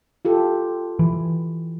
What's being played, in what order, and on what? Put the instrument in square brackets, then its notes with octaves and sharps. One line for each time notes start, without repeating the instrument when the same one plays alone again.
[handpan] F4 G4 A4
[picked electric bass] E3